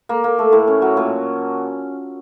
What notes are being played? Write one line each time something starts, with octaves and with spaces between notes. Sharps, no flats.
A#3
A#3
A3
A2
C#4
F#3
A#2